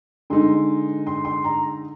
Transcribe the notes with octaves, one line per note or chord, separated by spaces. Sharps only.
D3 G#3 D#4 C6
C6
C6
A#5